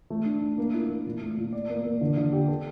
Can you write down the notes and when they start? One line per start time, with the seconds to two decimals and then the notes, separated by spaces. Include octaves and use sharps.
0.10 A3
0.25 D4
0.41 D4
0.58 A#3
0.74 E4
0.89 A#3
1.06 A#2
1.21 A3
1.37 A#2
1.53 D5
1.70 A#3
1.85 A#3
2.01 D3
2.17 D3
2.32 G4
2.48 A4